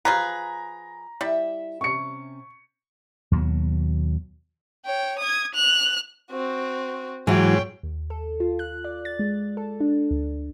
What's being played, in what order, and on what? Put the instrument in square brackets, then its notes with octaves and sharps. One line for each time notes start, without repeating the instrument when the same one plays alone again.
[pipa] F3 G#4 B4 [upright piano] A#5
[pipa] G3 [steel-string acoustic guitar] E4 E5
[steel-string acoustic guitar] C3 C#4 [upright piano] C#6 C#7
[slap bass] D#2 B2 F#3
[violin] C#5 G5
D#6 G#6
F#6 F7
[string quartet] C4 F#4
[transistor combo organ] G#2 [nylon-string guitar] E3 F#3 [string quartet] C#5 G5
[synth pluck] D#2
A4
F4
F#6
D5
A6
G#3
A4
D4
D2